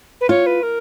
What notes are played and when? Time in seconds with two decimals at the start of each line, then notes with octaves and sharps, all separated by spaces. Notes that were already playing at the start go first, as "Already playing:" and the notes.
0.21 B4
0.29 F4 C#5
0.46 B4
0.63 A#4